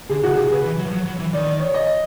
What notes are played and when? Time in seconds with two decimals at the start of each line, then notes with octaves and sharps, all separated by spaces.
0.10 D3 G#4
0.23 C#3 F#4
0.37 C3 G#4
0.51 C#3 B4
0.65 E3
0.78 F#3
0.86 F3
0.92 F#3
1.06 F#3
1.19 E3
1.33 D#3 D5
1.46 D5
1.59 C#5
1.74 D#5